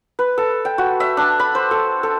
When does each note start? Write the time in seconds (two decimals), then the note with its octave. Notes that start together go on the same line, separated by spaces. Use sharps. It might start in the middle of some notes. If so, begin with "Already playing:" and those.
0.19 B4
0.38 A4
0.65 G5
0.78 F#4
1.00 E5
1.17 D4
1.40 B5
1.55 C5
1.71 A4
2.03 A4